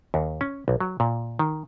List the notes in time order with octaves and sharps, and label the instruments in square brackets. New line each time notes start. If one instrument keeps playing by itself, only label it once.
[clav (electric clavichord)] D#2
C#4
B1
F#3
A#2
D#3